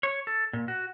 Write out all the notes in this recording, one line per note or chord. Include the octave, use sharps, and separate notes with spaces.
C#5
A4
A#2
F#4